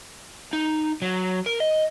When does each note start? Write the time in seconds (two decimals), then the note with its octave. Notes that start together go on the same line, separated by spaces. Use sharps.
0.53 D#4
1.02 F#3
1.46 A#4
1.60 D#5